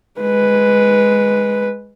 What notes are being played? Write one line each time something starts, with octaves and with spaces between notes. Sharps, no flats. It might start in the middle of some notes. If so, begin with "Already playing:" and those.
G#3 B4